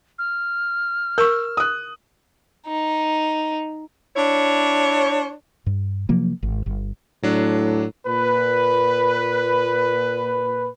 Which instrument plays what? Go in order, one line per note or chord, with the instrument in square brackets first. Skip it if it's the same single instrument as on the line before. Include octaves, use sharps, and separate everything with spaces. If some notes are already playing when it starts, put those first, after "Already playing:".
[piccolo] F6
[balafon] A#4 C#6 [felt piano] E6
[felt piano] D#6 F#6
[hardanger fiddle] D#4
[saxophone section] D4 E4 C#5
[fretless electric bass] G2
C3 F3 F#3 A#3
G#1
G1
[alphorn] A2 [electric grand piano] F#3 D4
[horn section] A#2 B4